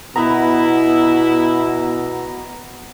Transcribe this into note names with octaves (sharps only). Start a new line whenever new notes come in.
B2 B3 E4 B4 A#5